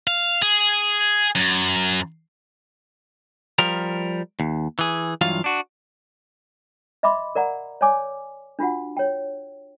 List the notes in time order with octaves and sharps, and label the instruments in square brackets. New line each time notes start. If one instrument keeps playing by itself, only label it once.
[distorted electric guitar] F5
G#4
F#2
[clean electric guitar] F3 G3 A#4
D#2
E3 G#4
G2 E3 F#3 F4 F5
D4 F#4
[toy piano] D#5 E5 B5 C6 D6
A#4 D5 F#5 A#5
C#5 D5 G#5 D6
D4 F4 F#4 F#5
C#5 G5